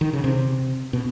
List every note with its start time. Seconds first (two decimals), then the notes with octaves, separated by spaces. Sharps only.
0.01 D#3
0.13 C#3
0.24 C3
0.93 B2